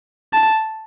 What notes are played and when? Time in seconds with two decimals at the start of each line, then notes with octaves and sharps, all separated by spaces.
0.33 A5